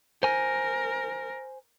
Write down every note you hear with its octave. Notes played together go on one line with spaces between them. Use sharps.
A#4 C5 G#5